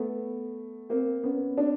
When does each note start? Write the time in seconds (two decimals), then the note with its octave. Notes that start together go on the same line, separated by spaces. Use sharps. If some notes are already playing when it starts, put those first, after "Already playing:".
Already playing: A3 B3
0.89 A#3 C4
1.24 B3 C#4
1.58 C4 D4